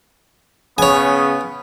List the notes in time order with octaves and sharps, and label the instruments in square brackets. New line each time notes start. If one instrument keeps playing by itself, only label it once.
[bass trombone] C#3 [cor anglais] B3 [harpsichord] C#5 G#5